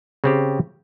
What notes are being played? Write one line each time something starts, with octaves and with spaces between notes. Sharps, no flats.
C#3 C4 G4